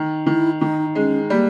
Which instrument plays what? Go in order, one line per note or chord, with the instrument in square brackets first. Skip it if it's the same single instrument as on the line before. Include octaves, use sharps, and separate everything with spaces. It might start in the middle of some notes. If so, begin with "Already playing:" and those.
Already playing: [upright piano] D#3
[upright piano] D#3 [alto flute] E4
[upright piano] D#3 [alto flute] D#4
[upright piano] G#3 [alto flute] C#4
[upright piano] G3 [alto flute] A#3